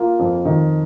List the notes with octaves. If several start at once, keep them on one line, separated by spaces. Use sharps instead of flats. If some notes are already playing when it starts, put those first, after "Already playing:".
Already playing: A#3 F4
F2
D#3